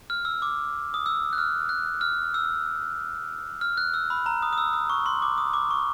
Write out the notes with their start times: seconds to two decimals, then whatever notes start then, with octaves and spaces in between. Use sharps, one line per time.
0.10 F6
0.25 E6
0.42 D6
0.94 D#6
1.06 E6
1.33 F#6
1.38 F6
1.69 F#6
2.01 F6
2.34 E6
3.61 F6
3.78 F#6
3.94 E6
4.10 B5
4.26 A#5
4.42 D#6
4.53 D#6
4.58 E6
4.73 D#6
4.90 C#6
5.06 C6
5.22 D6
5.38 D#6
5.54 D6
5.71 C#6